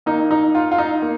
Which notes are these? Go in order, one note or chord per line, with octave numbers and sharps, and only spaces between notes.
D#3 A#3 D#4
D#4
F4
F4
D#4
A#3